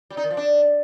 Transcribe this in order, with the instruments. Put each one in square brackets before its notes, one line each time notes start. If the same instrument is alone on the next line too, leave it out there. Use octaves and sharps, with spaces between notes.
[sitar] G3
D#4
D#3
F3
D4